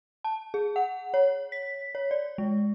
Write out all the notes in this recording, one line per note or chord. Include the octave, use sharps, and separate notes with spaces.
A5
G#4
F#5
C#5
B6
C#5
D5
G#3